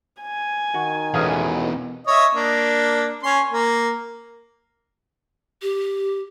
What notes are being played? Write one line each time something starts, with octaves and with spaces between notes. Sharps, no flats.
G#5
D#3 F#4
A1 E2 B2 G#4 F5
C#5 D#5 E5
A#3 D4
C#4 C6
A#3
G4